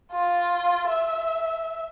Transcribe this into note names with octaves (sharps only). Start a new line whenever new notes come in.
F4
E5